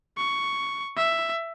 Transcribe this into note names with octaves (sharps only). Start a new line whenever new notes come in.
C#6
E5